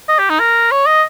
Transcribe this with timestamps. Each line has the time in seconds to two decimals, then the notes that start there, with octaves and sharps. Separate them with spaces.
0.09 D#5
0.19 G4
0.30 D#4
0.40 A#4
0.72 C#5
0.87 D#5